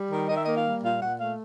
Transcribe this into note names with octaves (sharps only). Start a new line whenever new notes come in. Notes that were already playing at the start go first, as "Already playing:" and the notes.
Already playing: G3
D#3
D#3 D#5
E5
A#3 D#5
F5
G3
A#2 F5
A#2 F#5
A3 F5